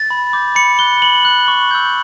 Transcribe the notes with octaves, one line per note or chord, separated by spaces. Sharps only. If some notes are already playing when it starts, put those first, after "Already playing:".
Already playing: A6
B5
D6 G6
B5 C#7
F#6 G7
B5 F#7
F#6
C#6
E6 G6